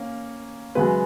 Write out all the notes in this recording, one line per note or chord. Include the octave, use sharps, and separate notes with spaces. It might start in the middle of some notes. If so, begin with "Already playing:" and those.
Already playing: A#3 C#4
F#2 C#3 G#3 B4